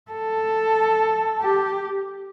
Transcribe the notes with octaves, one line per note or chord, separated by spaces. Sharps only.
A4
G4